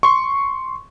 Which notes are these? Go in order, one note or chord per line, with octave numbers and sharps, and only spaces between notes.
C6 C#6